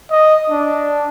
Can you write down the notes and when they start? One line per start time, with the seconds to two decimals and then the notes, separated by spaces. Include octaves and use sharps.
0.11 D#5
0.50 D4